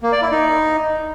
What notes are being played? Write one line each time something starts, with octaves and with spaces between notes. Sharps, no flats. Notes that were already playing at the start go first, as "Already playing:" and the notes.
A#3
D5
E4
D#4